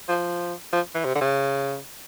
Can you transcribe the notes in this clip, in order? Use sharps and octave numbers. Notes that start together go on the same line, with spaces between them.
F3
F3
E3
C3
D3
C#3